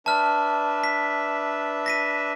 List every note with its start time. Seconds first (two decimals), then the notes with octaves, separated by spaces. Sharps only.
0.06 D4 B4 E5 A5 F6
0.84 B6
1.86 A#6 B6 D#7